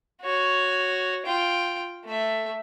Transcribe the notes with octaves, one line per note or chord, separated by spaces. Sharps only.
F#4 C#5
F4 G5
A3 E5